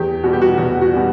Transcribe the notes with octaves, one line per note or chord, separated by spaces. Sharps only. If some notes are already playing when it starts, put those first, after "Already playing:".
Already playing: E2 G4
B2 G3 F#4
G4
F#4
E2 F#4
F#4
B2 G3